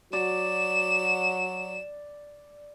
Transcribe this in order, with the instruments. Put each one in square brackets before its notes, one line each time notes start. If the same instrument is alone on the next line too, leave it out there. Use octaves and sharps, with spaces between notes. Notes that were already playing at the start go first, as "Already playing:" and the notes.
[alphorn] F#3 [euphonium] F#4 [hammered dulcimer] D5 [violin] E7